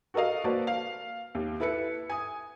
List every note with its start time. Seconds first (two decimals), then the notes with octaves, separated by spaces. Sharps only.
0.14 F#4 A4 A#4 D#5 F5
0.44 A#3 F#4 B4 C5 D5 A5
0.67 F5
1.35 D#2
1.60 E4 A4 B4 E5 C#7
2.10 G#5 D#6